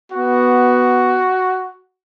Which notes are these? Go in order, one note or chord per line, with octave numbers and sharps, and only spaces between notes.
B3 F#4